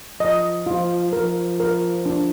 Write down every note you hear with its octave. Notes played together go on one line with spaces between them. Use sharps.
F3 D#5
F3 F4
F3 A#4
A#4
D4